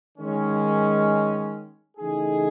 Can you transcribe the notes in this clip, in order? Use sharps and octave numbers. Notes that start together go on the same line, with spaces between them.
D#3 G#3 C#4
C#3 E3 A3 D#4 G#4